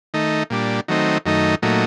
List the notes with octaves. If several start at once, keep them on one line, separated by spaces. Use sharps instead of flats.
D#3 A3 D#4
A#2 G3 D4
D#3 F#3 A3 C4 D#4
F#2 D#3 A3 D#4
A#2 F#3 A3 D#4